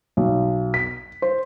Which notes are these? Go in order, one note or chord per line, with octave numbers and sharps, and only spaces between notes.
B1
B6
C5